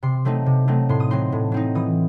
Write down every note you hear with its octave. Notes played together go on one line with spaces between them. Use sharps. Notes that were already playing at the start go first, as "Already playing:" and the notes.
C3 C6
F#3 A3 C4 D#4
C3
F#3 A3 C4 D#4
A2 C6
D#6
F#3 C4 D#4 C6
A2
F#3 C4 D#4
E3 D#6